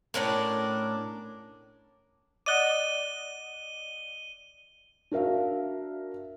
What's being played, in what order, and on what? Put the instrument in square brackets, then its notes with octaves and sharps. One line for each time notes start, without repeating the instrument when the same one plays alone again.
[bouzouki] A2 C#4 D4 A#4
[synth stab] D5 D#5 F#5 [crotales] D#7 G7
[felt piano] D4 F#4 A#4 E5 F5